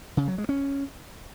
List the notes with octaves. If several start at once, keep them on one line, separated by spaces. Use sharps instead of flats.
C#3
F#3
G#3
C#4